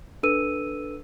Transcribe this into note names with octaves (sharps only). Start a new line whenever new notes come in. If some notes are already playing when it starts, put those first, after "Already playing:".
D4 A4 B4 E6 D#7